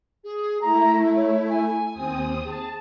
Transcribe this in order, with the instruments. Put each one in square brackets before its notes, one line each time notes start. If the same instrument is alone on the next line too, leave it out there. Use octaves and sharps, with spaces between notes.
[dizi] G#4
[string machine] A3 E4 [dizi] A#5
[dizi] C#5
G#5
[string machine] D#2 C4 D#6
[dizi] G#4 [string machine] A5